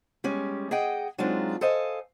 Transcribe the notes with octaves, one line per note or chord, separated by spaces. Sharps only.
G3 G#3 C#4
G#4 D#5 F#5 G5
F#3 G#3 C4 D4 D#4 F4
A4 C5 D#5 F5 G#5